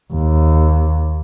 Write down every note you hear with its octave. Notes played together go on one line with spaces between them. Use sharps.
D#2